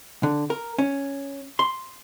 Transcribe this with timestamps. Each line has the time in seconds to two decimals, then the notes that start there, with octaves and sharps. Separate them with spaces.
0.23 D3
0.50 A#4
0.78 C#4
1.59 C6